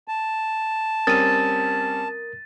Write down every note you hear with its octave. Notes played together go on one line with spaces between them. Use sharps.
A5
G3 C4 C#4 A#4 D#6 A6 D#7